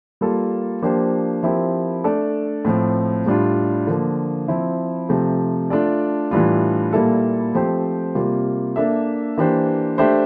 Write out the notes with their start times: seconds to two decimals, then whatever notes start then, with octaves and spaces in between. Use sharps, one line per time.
0.21 G3 A#3 F4 A4
0.82 F3 A#3 D4 G4 C5
1.43 F3 C4 E4 G4 A#4
2.04 A3 D4 A4 D5
2.65 A2 F3 C4
3.26 A2 G3 D4 F4
3.87 D3 F3 A#3
4.48 F3 C4 E4
5.09 C3 F3 A3
5.70 A3 D4 F4 A4 D5
6.31 A2 E3 G3 D4 F4
6.93 A#2 G3 A#3 E4 A4
7.54 F3 A3 C4 G4 C5
8.15 C3 G3 A#3 F4
8.76 A#3 D4 A4 E5
9.38 E3 A#3 D4 G4 C5
9.98 A3 D4 G4 C5 E5